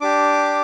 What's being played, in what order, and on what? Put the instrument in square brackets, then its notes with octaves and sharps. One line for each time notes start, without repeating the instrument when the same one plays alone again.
[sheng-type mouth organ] D4 G4 D6